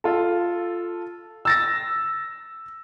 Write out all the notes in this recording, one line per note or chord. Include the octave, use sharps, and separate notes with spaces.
F4 A4
E6 A6 A#6